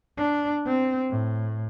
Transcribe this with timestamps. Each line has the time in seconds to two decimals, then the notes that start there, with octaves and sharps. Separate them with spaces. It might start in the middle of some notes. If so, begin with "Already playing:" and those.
0.17 D4
0.66 C4
1.10 A2